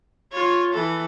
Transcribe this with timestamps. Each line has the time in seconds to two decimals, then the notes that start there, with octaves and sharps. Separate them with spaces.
0.32 F4 C#5
0.73 E3 A4